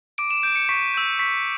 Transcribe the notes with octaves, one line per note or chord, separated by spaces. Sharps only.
D6 D7
E7
G6 D7
C#7
C#6 B6
E6 G6
C#6 B6